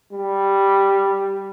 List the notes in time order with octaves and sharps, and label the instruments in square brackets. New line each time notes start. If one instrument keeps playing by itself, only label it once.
[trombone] G3